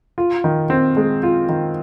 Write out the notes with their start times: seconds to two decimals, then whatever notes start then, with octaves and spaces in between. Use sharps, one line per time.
0.18 F4
0.44 D#3
0.70 C4
0.97 G#3
1.23 F4
1.49 D#3